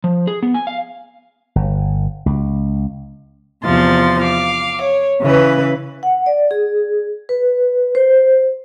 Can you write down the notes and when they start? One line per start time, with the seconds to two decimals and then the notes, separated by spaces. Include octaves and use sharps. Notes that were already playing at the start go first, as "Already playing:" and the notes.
0.04 F3
0.27 G#4
0.43 B3
0.54 G#5
0.67 F5
1.56 G1
2.26 C#2
3.64 E2 C3 F3 C6 A6
4.22 F5 D6
4.81 C#5
5.22 C#3 E3 B4
6.03 F#5
6.26 D5
6.51 G#4
7.29 B4
7.95 C5